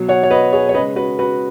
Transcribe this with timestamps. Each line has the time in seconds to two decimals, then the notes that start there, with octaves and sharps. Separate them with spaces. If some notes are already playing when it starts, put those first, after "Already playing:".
Already playing: B2 F#3
0.09 C#5 F#5
0.23 C#5
0.31 B4 D#5
0.52 G#4 C#5
0.69 C#5
0.74 C#3 B4 D#5
0.78 G#3
0.96 F#4 B4
1.19 F#4 B4